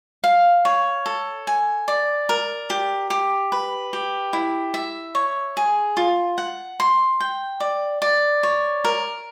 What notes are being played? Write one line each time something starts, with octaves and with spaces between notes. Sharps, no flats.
F5
C#5
A4
G#5
D5
A#4
G4
G4
B4
G4
E4
E5
C#5
G#4
F4
F#5
C6
G5
D5
D5
C#5
A#4